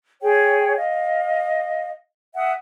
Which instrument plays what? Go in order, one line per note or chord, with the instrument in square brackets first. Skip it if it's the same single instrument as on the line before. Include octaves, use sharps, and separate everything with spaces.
[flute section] G#4 C#5 G5
D#5 F5
E5 F#5 D#6